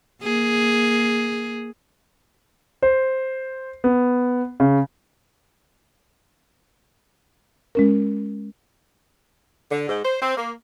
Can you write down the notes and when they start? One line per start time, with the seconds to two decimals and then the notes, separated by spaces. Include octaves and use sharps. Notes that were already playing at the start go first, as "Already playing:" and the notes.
0.23 A#3 G#4
2.82 C5
3.84 B3
4.60 C#3
7.75 G#3 C#4 A#4
9.71 D3
9.89 G#2
10.04 C5
10.21 C4
10.37 A#3